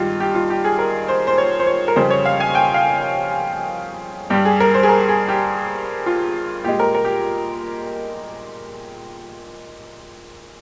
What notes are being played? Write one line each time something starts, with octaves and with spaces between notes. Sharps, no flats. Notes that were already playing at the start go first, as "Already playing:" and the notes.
Already playing: G2 D#3 G#3 F4 G4
G4
F4
G4
G#4
A#4
C5
C5
C#5
C5
C#5
A#4
F2 C#3 G3 C5
C#5
F5
G#5
G5
F5
G2 G3 G4
G#4
A#4
C5
G#4
A#4
G#4
G4
F4
A#2 G#3 G4
A#4
A#4
G4